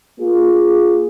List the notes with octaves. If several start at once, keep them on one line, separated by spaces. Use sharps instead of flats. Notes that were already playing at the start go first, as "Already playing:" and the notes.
A#3 F4 G#4